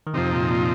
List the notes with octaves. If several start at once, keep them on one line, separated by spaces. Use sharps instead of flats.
D#3
F2 C3 F3 C4 D#4
A#2
A#2